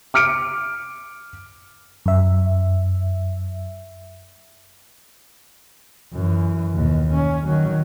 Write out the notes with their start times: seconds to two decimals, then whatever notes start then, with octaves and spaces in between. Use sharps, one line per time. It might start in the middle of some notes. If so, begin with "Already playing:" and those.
0.14 D6 F6 C#7 D7
2.06 F#2 E5
6.13 F#2 E3
6.75 D#2 B2
7.14 C#4
7.47 D#3 F#3